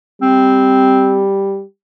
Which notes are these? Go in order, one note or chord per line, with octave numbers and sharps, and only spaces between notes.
G3 C4